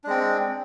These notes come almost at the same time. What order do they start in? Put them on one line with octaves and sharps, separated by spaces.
D4 G#3 C4